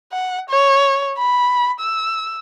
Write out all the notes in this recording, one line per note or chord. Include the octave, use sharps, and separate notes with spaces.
F#5
C#5
B5
E6